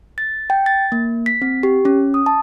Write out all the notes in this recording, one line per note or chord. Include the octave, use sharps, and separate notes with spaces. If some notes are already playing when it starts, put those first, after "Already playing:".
A6
G5
A6
A#3
B6
C4
G4
C#4
D#6
A5